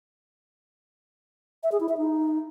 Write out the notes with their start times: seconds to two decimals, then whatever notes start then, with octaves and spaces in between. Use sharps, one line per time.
1.63 E5
1.72 G#4
1.80 E4
1.89 E5
1.97 D#4